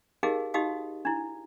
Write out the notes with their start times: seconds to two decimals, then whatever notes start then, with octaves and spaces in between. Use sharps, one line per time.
0.23 D#4 G4 G#4 A#4 D#5 F5
0.54 D#4 F#4 G4 D#5 F5 D#6
1.05 D4 E4